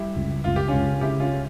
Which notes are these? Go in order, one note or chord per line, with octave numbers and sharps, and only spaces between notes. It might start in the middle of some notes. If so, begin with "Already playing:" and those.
Already playing: G3 E4 G4
C#2
C#2 F4
G4
C#2 C#4 F4
C#3 E4 G4
C#4 F4